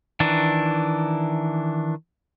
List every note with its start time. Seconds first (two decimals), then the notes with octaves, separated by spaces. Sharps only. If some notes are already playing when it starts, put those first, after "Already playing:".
0.20 D#3 E3 D4